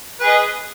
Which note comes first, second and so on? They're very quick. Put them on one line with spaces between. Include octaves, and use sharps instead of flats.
B4 G#4 D#5